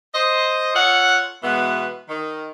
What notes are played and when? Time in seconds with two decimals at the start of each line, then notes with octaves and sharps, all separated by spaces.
0.14 C5 D#5
0.74 F4 A4 C#5 F#5
1.43 B2 E3 G#3 B3
2.08 D#3